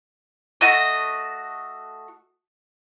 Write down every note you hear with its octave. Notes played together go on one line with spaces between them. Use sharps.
A3 F#4 D#5